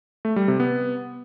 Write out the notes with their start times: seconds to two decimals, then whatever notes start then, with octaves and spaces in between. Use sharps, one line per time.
0.25 A3
0.36 G3
0.48 C3
0.60 B3